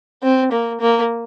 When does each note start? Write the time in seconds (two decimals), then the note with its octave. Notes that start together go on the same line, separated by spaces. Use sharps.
0.23 C4
0.52 A#3
0.80 A#3